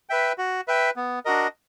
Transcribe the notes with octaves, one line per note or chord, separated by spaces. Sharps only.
B4 E5 G5
F#4
B4 E5 G5
B3
D4 F#4 A#4 D#5